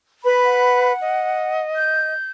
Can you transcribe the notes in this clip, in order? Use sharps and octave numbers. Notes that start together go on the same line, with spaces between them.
B4 B5
F#5
D#5
G6